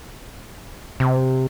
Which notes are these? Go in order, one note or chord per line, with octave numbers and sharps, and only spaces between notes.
C3